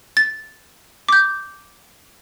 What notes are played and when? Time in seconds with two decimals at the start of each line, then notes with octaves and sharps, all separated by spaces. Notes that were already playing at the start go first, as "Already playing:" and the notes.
0.17 A6
1.09 D6 G6